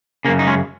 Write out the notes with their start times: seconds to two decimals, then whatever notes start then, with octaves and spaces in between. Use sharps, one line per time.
0.25 C#3 A#3
0.28 F#2
0.39 D#4
0.47 G#3 C#4